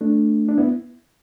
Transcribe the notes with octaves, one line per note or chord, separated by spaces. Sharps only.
A3 D4
D4
B3 E4